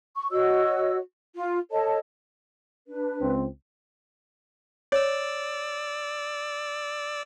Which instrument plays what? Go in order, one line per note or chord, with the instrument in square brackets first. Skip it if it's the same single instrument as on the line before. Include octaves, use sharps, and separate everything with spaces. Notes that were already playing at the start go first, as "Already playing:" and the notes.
[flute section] C#6
F#4 C#5 D#5 E6
F4
A4 C#5 D#5 A5
D4 B4
[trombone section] C#2 C4
[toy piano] C#5 [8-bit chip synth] D5 E6